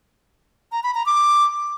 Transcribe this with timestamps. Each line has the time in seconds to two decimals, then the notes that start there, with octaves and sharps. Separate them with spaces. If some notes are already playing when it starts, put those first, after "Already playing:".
0.72 A#5
0.83 B5
0.95 A#5
1.06 D6